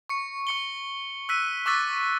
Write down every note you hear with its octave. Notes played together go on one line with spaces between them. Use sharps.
C#6 C#7
C#6 C#7 G7
E6 F#6 B6 D#7
C#6 D6 E6 F#6 A6 B6